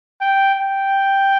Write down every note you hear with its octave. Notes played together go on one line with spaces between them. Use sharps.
G5
G5